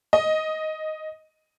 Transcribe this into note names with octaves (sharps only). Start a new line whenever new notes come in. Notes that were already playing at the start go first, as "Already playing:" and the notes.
D#5